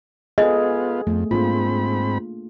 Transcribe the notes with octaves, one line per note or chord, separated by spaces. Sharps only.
B3 F4 G#4 A4 D#5
F2 A3 B3
G#2 A#3 C4 D4 F4 B5